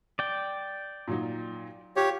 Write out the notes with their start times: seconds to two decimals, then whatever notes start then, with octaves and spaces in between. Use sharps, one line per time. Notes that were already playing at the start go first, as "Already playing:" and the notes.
0.19 D5 G5
1.08 A#2 F#3 D#4
1.96 F4 G4 C#5